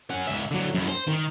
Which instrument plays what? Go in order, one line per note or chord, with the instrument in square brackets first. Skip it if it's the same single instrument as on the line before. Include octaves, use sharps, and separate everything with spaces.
[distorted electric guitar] C#4 F#5
C#2 E5
D3 F#3
F#2 E4
C5
D#3